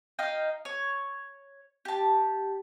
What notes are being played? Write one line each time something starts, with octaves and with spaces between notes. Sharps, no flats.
D#4 D#5 F5 G5
C#5
G4 A5